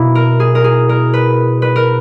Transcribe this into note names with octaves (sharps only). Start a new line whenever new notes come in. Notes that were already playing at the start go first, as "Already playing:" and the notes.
Already playing: B2 A#3 E4
A#4
G#4
A#4
G#4
A#4
B4
B4
A#4